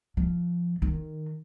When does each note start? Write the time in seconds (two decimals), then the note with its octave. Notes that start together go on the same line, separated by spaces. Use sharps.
0.17 F3
0.82 D#3